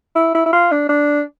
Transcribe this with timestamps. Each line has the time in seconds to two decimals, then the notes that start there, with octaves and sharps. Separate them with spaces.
0.15 E4
0.34 E4
0.46 E4
0.53 F4
0.71 D4
0.89 D4